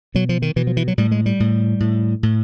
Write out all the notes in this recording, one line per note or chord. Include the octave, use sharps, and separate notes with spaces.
B2 F#3
F3
D#3
B2 E3
F3
E3
F#3
A2 G3
G#3
G3
A2
A2
A2